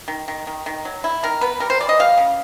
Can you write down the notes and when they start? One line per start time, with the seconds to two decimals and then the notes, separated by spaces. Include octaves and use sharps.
0.08 D#3
0.28 D#3
0.47 D#3
0.66 D#3
0.85 F#3
1.04 E4
1.23 D#3 A#4
1.41 B3 B4
1.60 G3 A#4
1.70 C5
1.80 E3 D5
1.89 D#5
1.99 G3 F5
2.17 C#3